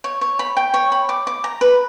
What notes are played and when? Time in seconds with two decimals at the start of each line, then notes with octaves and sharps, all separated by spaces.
0.04 C#5
0.21 C#5
0.39 B5
0.57 G5
0.74 C#5
0.92 B5
1.09 D6
1.27 D6
1.44 A#5
1.61 B4